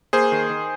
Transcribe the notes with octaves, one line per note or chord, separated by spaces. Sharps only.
A#3 G#4 C5
D#3
D#3